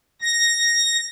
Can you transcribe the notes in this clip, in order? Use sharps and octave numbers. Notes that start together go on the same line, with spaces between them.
A#6